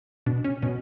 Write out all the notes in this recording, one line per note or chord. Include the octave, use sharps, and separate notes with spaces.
B2 D4
C#4
B2 C#4